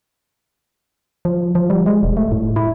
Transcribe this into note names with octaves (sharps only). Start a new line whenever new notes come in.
F3
F3
G3
G#3
E1
A3
A2
E4